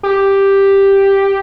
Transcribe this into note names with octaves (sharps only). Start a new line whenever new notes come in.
G4